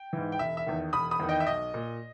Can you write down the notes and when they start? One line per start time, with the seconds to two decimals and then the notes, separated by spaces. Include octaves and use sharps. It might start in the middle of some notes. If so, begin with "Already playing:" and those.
Already playing: G5
0.13 G#2 E3
0.32 G5
0.39 E1 E5
0.57 E5
0.66 E2 D#3
0.93 E1 B5 D#6
1.11 B5 D#6
1.20 E2 D#3
1.29 D#5 G5
1.40 E5
1.47 B1 D#5
1.74 A#2